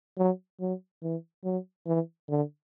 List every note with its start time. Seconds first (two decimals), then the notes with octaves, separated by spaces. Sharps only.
0.17 F#3
0.60 F#3
1.02 E3
1.44 F#3
1.87 E3
2.29 D3